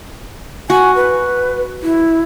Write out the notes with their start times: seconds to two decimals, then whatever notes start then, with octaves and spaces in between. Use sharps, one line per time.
0.70 F#4 G#5
0.96 B4
1.83 E4